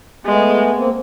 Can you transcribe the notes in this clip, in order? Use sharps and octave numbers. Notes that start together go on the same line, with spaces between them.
G#3 A3 B3
A#3 C4